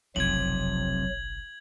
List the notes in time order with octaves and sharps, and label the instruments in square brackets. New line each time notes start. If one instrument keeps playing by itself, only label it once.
[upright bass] F#1 B1 [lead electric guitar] F2 C3 [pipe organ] F#3 [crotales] G#6 F#7